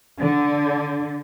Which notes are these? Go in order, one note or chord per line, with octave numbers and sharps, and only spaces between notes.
D3